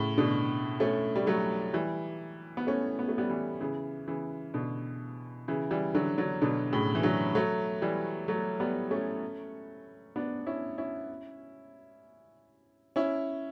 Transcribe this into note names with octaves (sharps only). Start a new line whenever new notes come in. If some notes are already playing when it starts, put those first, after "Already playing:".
Already playing: A2 C#3
B2 D3
A3 C#4
G3
F#3 A3
E3 G3
B3
A3 C#4
B3
A3
G3 B3
E3 G3
C#3 E3
C#3 E3
B2 D3
C#3 E3
E3 G3
D3 F#3
D3 F#3
B2 D3
A2 C#3
E3
D3 F#3
F#3 A3
E3 G3
F#3 A3
G3 B3
A3 C#4
B3 D4
C#4 E4
C#4 E4
C#4 E4